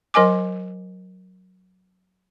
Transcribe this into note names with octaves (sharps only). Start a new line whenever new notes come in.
F#3 A#4 D#5 G#5 D6